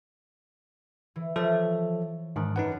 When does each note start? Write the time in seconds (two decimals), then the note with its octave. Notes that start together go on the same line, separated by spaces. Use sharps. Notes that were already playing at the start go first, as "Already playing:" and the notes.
1.16 E3
1.36 F3 A4 C#5 E5 A6
2.36 G#2 D#3 D4
2.56 F#2 D#4 B4 F#5